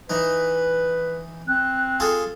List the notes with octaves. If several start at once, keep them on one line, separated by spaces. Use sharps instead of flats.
E3 D#4 B4
C4 F#6
F4 G#4 A4